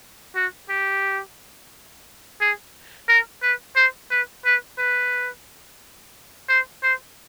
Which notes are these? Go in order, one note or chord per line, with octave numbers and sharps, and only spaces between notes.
F#4
G4
G#4
A#4
B4
C5
B4
B4
B4
C5
C5